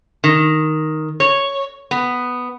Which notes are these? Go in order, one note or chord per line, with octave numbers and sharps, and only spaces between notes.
D#3
C#5
B3